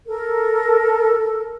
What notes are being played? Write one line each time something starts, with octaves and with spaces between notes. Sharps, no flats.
A4 A#4